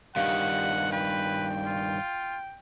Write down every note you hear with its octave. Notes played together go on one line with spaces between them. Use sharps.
G2 D#3 G4 F5 F#5
B4 G5
F4